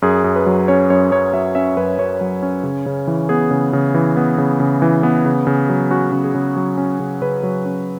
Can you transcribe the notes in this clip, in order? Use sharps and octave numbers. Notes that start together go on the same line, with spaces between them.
F#2 G#4
F#2
B4
F#3
C#4 C#5
F#2 C#5
F#2 C#5
F#3 E5
C#4 E5
F#2 B4
F#2 C#5
F#3
C#4
C#3
C#3
E3
B3 G#4
C#3
C#3
E3
B3
C#3
C#3
E3
B3
C#3
C#3
F#3
C#4 F#4
C#3
G#4
C#3
F#3
C#4
C#3
C#3 B4
F#3
C#4